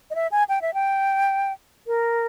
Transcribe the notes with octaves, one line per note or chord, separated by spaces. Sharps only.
D#5
E5
G#5
G5
E5
G5
A#4